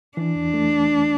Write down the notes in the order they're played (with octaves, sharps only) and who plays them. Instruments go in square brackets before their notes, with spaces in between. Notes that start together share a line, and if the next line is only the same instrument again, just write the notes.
[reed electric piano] E3 [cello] D4
[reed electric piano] E2
A3